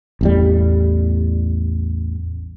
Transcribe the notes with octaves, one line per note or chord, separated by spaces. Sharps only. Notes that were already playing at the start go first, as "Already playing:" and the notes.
A1 E2 G3